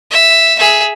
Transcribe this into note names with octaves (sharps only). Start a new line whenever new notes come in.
E5
G#4 E5